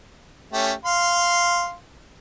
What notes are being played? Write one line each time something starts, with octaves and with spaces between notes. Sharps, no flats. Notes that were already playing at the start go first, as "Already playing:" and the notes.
A3 C#4 G4
F5 C6